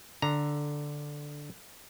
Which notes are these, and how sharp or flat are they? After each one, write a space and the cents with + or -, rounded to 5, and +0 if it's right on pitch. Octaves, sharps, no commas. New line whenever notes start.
D3 +0 A#5 +0